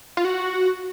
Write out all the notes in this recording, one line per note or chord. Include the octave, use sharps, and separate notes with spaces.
F4
F#4